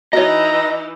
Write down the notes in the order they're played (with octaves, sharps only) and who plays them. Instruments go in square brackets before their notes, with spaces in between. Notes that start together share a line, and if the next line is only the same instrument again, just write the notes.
[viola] E3 D#4 [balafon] F#4 C#5 [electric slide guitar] D#5 [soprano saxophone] A#5